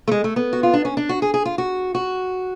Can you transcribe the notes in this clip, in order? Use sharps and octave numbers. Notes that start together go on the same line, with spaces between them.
A3
G#3
A3
B3
F#4
F4
D4
C#4
D4
F#4
G#4
G#4
F4
F#4
F#4